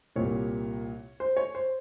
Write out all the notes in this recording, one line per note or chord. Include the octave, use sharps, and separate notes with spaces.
C2 A#2 G3 C#5
C5
C#5
C5